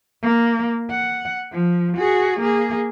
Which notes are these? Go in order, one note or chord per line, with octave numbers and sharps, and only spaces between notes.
A#3
F#5
F3
F#4 G#4
A#3 G#4